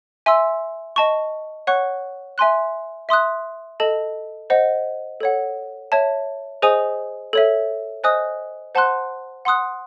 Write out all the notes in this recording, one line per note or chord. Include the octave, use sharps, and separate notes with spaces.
E5 G#5 C6 E6
D#5 A5 C#6
C#5 F#5 C#6 F#6
E5 G#5 C6 F#6
E5 C6 D#6 F#6
A4 D#5 A5
C5 D#5 F#5
A4 C#5 F#5
C#5 E5 A5
G#4 C5 D#5 G#5 D#6
A4 C#5 E5
C5 D#5 G#5 D#6 F#6
C5 F#5 A5 C6 F#6
F#5 C6 D#6 F#6